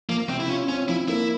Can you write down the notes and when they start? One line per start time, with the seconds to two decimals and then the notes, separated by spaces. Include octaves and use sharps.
0.09 F3 A#3
0.29 C3 C4
0.40 E4
0.49 C#4 F4
0.69 C4 C#4
0.88 F3 E4
1.08 A#3 E4